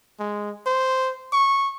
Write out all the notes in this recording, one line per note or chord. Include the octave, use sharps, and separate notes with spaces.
G#3
C5
C#6